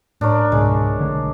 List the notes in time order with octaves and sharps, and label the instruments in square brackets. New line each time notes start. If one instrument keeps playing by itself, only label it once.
[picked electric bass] A2 [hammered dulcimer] D4 A#4 C#5
[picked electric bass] C#2 G#2 B2 [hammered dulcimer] G#3
[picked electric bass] B1 D3 A3